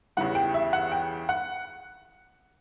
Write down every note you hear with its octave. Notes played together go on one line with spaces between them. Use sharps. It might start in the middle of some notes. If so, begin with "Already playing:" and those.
E2 C#3 E3 G3 F#5
G5
E5
F#5
G5
F#5